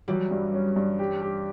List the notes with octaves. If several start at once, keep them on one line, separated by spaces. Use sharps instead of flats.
E3 F#3 G3
G2
C#4
G2
G4
G4